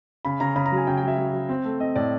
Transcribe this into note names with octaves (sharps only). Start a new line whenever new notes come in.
C#3 B5
C#3 A#5
C#3 B5
A#5
F#3
G#5
C#3 G5
G5
F#3 E5
F#3
F#3
C4
A3
C4 D#5
A2 D5